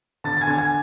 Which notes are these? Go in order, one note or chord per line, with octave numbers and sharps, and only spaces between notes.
D3 A5 A6
A6
G#5 G#6
D3
G#5 G#6